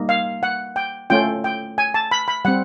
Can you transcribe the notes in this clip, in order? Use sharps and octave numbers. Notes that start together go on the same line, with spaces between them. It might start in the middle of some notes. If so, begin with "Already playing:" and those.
Already playing: G3 A#3 D#4
F5
F#5
G5
A3 C#4 F4 G5
G5
G#5
A5
B5
B5
G3 C4 F#5